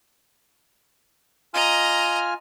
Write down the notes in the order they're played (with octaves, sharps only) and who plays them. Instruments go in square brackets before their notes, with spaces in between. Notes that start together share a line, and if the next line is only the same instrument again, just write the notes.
[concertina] F4 G#5 F6 [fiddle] D#5 A#5